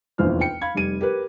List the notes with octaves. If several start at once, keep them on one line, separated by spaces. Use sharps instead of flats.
F1 A#1 E2 F3 C5 F6
G5 C#7
F5 B5 G#6
F1 G3 D#7
G4 A#4 B4